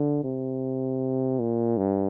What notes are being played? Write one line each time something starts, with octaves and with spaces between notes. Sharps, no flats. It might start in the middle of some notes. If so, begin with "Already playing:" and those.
Already playing: D3
C3
A#2
G2